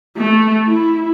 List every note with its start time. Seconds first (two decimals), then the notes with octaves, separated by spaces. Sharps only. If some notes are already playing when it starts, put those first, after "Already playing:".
0.17 A3
0.67 E4